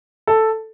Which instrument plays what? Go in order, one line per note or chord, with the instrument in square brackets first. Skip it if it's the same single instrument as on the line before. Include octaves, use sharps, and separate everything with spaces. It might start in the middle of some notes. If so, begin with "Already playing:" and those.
[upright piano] A4